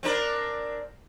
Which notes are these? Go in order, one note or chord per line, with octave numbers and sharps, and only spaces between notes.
C4 D4 A#4